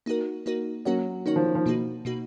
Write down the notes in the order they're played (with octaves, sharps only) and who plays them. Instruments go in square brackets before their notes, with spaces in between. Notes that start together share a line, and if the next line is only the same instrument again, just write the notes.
[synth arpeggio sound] A#3 D#4 F#4 A#4
A#3 D#4 F#4 A#4
[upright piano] F#3 [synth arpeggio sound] A#3 C#4 F#4 A#4 C#5
[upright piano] D#3 [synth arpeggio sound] A#3 C#4 F#4 A#4 C#5
[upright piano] F3
D#3
F3
[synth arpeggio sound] B2 A#3 D#4 F#4
B2 A#3 D#4 F#4